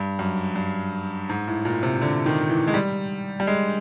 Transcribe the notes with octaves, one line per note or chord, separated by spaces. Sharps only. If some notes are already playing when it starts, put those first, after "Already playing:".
Already playing: G2
F#2
G2
G#2
A2
A#2
C3
D3
D#3
E3
G#3
G3
G3
G#3